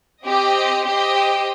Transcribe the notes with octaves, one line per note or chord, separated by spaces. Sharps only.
C4 G4 D#5
G4 C5 D#5 G5